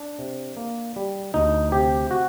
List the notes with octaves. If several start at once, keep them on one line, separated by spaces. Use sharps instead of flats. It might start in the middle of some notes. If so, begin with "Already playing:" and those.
Already playing: D4
C3
A#3
G3
D2 D#4
C3 G4
F#4